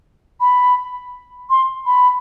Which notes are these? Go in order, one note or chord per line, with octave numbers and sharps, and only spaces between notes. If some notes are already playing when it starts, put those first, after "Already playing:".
B5
C6
B5